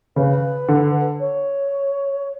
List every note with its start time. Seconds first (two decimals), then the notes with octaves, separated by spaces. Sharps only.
0.16 C#3 B4
0.68 D3
1.20 C#5